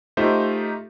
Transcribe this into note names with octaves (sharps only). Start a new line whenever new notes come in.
A3 D#4 F4 G4 C5 E5